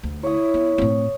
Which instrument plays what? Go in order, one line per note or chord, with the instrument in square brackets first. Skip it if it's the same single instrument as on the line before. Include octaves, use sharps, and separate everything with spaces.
[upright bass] D2
[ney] E4 [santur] C#5 D#6
[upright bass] B3
A2 C4